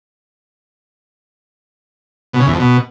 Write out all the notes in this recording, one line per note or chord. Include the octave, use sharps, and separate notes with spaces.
B2
C#3
E2
F2
B2